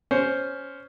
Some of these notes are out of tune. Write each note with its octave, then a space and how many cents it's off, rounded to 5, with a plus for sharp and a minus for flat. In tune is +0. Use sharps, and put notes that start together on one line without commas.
C#4 +10 C5 +0